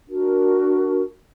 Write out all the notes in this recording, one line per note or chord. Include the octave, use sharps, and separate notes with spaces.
D4 F#4 A#4